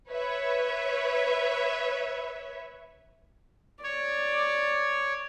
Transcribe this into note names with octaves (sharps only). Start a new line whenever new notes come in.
B4 C#5 E5
C#5 D5